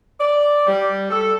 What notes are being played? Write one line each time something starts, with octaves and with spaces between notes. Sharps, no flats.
D5
G3
A4